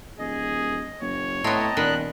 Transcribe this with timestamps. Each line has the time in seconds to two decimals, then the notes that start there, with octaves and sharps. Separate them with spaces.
0.19 D#1 G#4 D#5
1.01 F#1 C#5
1.44 A2 B3 C4 D#5 A5 A#5
1.77 D#1 A#2 D#3 B3 F#6